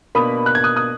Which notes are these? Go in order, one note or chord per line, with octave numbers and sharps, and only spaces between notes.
B2 A#3 D4 B5 D#6
F#6
G#6
D#6 F#6
D#6 F#6